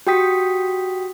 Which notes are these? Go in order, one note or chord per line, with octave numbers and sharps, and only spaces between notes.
F#4 G4 G5 D#6 B6